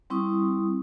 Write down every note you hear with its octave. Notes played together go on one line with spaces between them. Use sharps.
G3 C4 E4 C#6 D#6